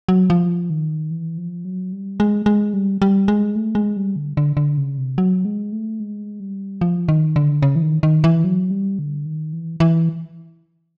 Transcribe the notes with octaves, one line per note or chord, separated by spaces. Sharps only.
F#3
F3
D#3
E3
F3
F#3
G3
G#3
G#3
G3
G3
G#3
A3
G#3
G3
D3
D3
D3
C#3
C3
F#3
G#3
A3
G#3
G3
F3
D#3
D3
C#3
E3
D#3
D#3
E3
F#3
G3
D3
D#3
E3
E3